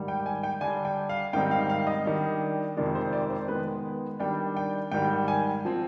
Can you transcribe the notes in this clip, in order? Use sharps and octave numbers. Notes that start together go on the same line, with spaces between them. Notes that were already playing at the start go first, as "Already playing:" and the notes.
Already playing: G#2 D#3 G3
G5
G#5
G5
D3 G3 D4 G#5
G5
F5
G#2 D#3 G3 C4 D#4 G5
F5
F5
D#5
D#3 G3 D4
F2 C3 D#3 G#3 D5
C5
D5
C5
D#3 G#3 B3 B4
D#3 G3 D4 G5
G5
G#2 D#3 G3 G5
G#5
F3 C4